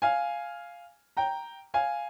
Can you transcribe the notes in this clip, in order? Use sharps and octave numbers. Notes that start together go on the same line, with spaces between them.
F5 G#5
G5 A#5
F5 G#5